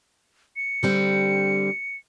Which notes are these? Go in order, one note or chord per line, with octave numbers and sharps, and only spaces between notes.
C#7
D3 G3 C4